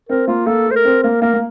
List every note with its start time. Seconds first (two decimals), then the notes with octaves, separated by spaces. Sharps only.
0.09 C4 A#4
0.28 A#3 F4
0.46 A#3 A4
0.66 A3 C5
0.76 A#4
0.85 C4
1.03 A#3 A#4
1.22 A#3 A#4
1.34 A#3